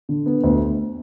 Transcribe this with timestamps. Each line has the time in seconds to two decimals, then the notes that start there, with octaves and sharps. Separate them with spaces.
0.09 D3
0.26 B3
0.44 D2